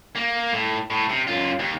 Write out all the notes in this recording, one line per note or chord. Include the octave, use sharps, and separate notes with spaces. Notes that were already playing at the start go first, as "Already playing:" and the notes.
A#3
A2
A2
C3
F#2 F4
D#2